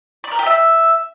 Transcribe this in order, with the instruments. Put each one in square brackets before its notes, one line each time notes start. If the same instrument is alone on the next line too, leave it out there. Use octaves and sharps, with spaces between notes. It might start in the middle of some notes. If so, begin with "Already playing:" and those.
[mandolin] D5
A#4
G4
E5